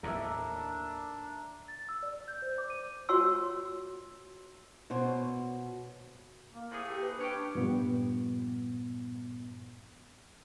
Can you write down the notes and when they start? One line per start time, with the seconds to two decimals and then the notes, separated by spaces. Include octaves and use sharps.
0.03 D#2 A2 D4 A#4 D5 E5
1.68 A6
1.89 E6
2.03 D5
2.28 G6
2.42 C5
2.58 D6
2.70 D#7
3.09 F4 F#4 C#5 C6 E6
4.90 B2 F#4 C5 C#5
6.52 A#3
6.71 A2 C3 G#4
6.89 G4
7.02 B4
7.19 C#4 D4 G4
7.55 G2 A#2 F3 B3